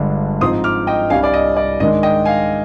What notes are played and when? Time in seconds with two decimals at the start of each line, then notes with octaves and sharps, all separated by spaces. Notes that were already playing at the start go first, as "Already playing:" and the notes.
Already playing: G1 G2 D3 G#3 D4
0.41 G#2 F3 C4 D#4 C6 D#6
0.64 D6 F6
0.87 D#5 G5
1.10 C2 C3 G3 D4 F5 G#5
1.24 D5
1.34 D#5
1.56 D5
1.80 G#2 D#3 G#3 D4 D#5
2.03 D#5 G5
2.25 F5 G#5